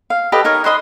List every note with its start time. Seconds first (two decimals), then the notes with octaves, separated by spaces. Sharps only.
0.10 F5
0.32 G4 A4 B4 D#5
0.45 D#4 A#4 C#5
0.64 B4 C5 D#5 C6